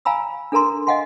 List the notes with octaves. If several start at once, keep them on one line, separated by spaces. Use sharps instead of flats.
F5 G#5 A#5 B5 E6
D4 A4 A#4 A#5 C6
D#5 F5 F#5 G#5 C6